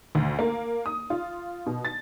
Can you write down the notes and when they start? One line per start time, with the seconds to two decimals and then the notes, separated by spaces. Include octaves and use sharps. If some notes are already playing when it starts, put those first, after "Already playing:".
0.15 D2
0.39 A#3
0.86 D#6
1.10 F4
1.66 B2
1.85 A6